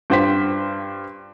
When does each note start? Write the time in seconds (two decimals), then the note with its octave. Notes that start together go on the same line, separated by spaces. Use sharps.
0.10 G2 F4 C5 G5 B6